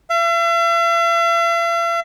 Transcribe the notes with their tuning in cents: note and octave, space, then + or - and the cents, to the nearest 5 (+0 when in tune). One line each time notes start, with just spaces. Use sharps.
E5 +45